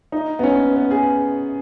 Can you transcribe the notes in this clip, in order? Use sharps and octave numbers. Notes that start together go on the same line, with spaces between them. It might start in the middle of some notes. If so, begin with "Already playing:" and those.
D#4
B3
C#4
B3
G#4